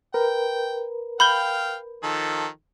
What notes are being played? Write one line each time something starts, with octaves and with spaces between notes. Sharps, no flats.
A#4 B4 G5
F5 G5 B5 G6 G7
D#3 F3 A4